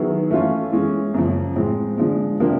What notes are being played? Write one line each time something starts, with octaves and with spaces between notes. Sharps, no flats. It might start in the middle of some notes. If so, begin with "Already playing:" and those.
Already playing: D#3 F#3 B3 E4 G#4
E3 A3 C#4 F4
E3 G#3 C#4
F#2 C#3 F3
A2 F3 G#3 C4
D3 F3 G#3
C3 F3 A#3 D4